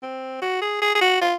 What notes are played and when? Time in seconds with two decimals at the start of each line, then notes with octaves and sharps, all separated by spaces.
0.03 C4
0.42 F#4
0.61 G#4
0.82 G#4
0.95 G#4
1.01 F#4
1.21 F4